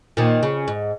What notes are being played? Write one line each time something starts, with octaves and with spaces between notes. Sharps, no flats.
A#2 D#3
C#3
G#2